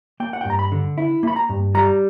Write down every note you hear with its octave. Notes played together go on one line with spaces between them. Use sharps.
A#3 G5
F#5
G5
G2 A#5
B5
D3
E4
A#3 B5
A#5
G2
G3 A#5